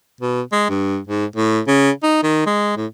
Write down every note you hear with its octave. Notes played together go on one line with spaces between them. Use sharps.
B2
G#3
G2
G#2
A2
C#3
D#4
D#3
G#3
A2